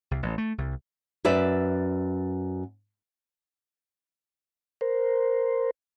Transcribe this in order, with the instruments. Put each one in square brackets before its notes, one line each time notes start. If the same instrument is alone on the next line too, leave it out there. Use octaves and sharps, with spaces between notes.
[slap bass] C2
A1
A3
C2
[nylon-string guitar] F#2 B4 D5 E5
[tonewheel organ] A#4 C5